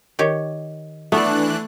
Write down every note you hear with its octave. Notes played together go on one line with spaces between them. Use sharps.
D#3 G4 C#5
E3 A3 B3 D4 D5 F#6